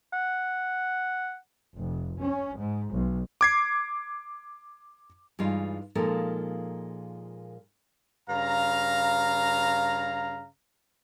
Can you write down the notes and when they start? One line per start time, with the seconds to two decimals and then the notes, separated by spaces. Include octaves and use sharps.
0.13 F#5
1.76 F1
2.20 C#4
2.57 G#2
2.92 B1
3.41 D6 G#6 C7
5.39 G2 E3 G#3 D#4 F4
5.95 A#2 F3 G#3 D#4 A4 A#4
8.29 G2 C#3 F5 A#5